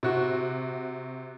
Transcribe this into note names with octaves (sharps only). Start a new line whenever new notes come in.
C3 F#4